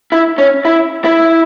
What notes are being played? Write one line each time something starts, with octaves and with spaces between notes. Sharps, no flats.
E4
C#4
E4
E4